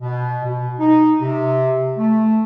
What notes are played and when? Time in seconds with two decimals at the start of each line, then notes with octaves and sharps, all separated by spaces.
0.01 B2
0.43 B2
0.79 D#4
1.21 C3
1.97 A3